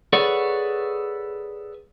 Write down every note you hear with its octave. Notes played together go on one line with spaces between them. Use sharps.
G#4 A4 B4 C#5 D5 F#5